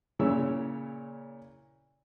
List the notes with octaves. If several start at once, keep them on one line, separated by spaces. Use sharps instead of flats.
A#2 C#3 C#4 E4 C#5 E6